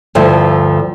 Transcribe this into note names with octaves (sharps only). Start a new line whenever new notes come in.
D2 G2 F3 A3